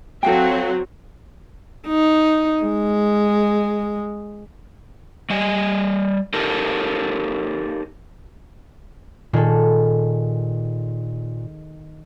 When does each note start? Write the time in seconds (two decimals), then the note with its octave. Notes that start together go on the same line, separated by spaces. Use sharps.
0.23 F#3 C4 F#4 A4 F5 G5
1.87 D#4
2.63 G#3
5.30 G3 D#5 G#5
6.34 D#4 G4 A4 A#4
9.33 A#2 D#3 G#4 A4